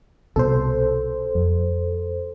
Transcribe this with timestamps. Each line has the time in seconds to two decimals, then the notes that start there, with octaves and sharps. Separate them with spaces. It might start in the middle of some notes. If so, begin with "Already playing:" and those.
0.36 C2 B2 A4 C5
1.35 F2